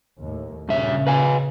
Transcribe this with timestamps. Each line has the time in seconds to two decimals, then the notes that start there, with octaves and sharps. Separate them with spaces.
0.18 D#2 A2
0.69 G2 A#2 C#3 E5
1.07 B4 F5 G#5